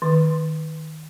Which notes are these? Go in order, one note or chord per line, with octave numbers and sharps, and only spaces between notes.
D#3